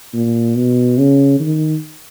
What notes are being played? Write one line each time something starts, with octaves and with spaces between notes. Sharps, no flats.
A#2
B2
C#3
D#3